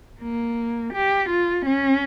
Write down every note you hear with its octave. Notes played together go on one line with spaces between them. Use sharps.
A#3
G4
F4
C#4